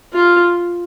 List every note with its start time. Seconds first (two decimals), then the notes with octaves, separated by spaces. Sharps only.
0.13 F4